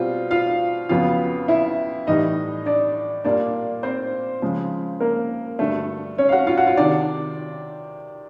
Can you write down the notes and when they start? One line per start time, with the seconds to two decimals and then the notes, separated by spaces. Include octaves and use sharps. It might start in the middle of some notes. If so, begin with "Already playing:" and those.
Already playing: B2 G3 C4 F4
0.31 F4 F5
0.89 F2 C#3 F#3 B3 F4 F5
1.48 E4 E5
2.07 A2 E3 G3 D#4 D#5
2.66 D4 D5
3.24 A#2 G3 A#3 D4 D5
3.83 C4 C5
4.42 C#3 F3 G#3
5.00 A#3 A#4
5.59 G2 D3 F#3 A3 A4
6.18 C#4 C#5
6.29 F5
6.32 F#4 F#5
6.47 F4 F5
6.57 F#4 F#5
6.66 F4 F5
6.77 C3 D#3 D4 D5